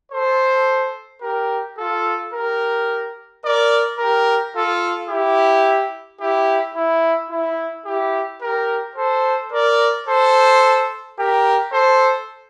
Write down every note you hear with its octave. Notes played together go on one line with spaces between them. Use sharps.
A4 C5
G4 A#4
F4 A4
G4 A#4
A#4 D5
G4 A#4
F4 A4
E4 G4
E4 G4
E4
E4
E4 G4
G4 A#4
A4 C5
A#4 D5
A4 C5
G4 A#4
A4 C5